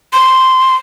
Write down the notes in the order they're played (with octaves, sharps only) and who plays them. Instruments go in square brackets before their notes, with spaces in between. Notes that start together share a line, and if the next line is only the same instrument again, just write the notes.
[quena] C6